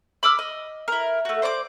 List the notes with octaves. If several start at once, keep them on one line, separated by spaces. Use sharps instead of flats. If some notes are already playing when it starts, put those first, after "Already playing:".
B5 D6 E6 F6
D#5
E4 A#4
A3 F#4
C5 D5 A5 D6